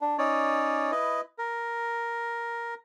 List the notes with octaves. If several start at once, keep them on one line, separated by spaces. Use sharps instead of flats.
D4
C#4 D#4 C#5 D5
E4 B4 D#5
A#4